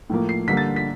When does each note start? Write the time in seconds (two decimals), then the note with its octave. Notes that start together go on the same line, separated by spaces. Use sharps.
0.10 A2 F3 A#3
0.29 C7
0.48 D3 G3 A#3 B6
0.57 A6
0.76 B6